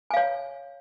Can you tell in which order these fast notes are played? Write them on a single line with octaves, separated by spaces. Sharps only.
G#5 F5 C#5